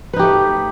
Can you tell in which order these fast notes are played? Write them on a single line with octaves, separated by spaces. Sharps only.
B4 D#4 G4 A3